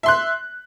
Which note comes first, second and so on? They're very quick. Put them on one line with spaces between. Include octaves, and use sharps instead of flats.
E5 C6 F#6